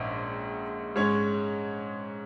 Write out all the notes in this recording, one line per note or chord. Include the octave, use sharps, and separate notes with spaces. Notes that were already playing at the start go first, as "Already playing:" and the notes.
Already playing: A#1 G#2 C#4
G#2 G#3 C#4 C#5